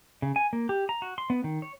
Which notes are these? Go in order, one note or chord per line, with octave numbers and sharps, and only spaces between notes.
C#3
G#5
A#3
G4
A#5
F#4
C6
B3
D#3
C#5